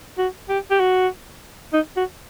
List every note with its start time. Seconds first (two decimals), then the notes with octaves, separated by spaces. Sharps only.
0.18 F#4
0.49 G4
0.70 G4
0.80 F#4
1.73 D#4
1.97 F#4